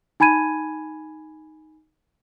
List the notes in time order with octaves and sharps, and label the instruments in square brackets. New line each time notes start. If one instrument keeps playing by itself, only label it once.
[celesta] D#4 G#5 B5 G#6 D#7